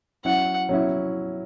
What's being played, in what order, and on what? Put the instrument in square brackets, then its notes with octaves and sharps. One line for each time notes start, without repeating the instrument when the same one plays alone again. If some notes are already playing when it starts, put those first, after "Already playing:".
[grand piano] F#3 C#4 E4 [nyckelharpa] F#5
[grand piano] F#3 C#4 E4